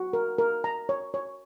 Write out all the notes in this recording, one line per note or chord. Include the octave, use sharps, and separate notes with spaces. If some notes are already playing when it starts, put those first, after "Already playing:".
Already playing: F#4
A#4
A#4
A#5
C#5
C#5